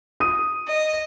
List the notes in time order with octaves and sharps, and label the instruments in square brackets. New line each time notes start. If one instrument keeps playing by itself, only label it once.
[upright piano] D#6 D#7
[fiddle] D#5